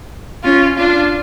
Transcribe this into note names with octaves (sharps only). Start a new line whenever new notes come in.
C#4 F4
D4 F4